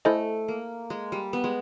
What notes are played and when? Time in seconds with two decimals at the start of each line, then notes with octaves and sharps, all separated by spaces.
0.05 A3 E4 A4 C5 D#5 G#5
0.48 A#3
0.90 G#3
1.12 G3
1.33 B3
1.44 G#3